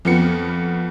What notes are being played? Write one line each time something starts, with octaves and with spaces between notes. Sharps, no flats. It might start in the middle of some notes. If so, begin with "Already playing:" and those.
F2 F3 B3 C#7